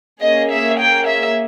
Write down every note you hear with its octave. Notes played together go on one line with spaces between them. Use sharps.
A#3 C#4 G#4 D#5
E5
G5
E5